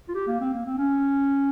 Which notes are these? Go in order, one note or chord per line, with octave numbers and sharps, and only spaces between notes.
F4
G4
A#3
C4
A#3
C4
C#4